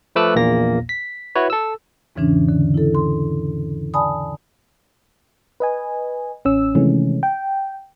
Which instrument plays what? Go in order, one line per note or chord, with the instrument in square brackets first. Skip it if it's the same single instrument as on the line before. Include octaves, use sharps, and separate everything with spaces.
[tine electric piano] F3 A3 B4 D6 E6 F#6
A#1 E2 A#2 A#3 A#6
B6
E4 F#4 B4 C#5
A4 E6
[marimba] E2 G#2 C#3 E3 C#4 D4
D3
E4 A4
C6
D5 G#5 A5 B5 D#6
[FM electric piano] B4 D#5 G#5
A1 C#4 E6
C3 D#3 E3 G#3 A3 C#4
G5